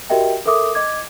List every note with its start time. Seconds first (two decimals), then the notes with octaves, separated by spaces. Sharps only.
0.10 F#4 G4 A#4 D#5 E5 G5
0.46 A4 A#4 E5 D6 D#6
0.75 D#5 D6 G#6